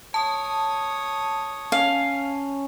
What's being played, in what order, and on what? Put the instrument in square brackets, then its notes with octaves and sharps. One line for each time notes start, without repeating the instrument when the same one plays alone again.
[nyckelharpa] C#5 D#6 [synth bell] A5
[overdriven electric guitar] C#4 [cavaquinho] F5